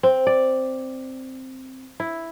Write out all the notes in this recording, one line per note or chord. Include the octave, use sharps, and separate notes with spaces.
C4
D5
E4